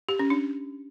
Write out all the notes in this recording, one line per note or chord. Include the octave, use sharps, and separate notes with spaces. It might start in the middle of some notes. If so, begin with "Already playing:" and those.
G4
C#4
D4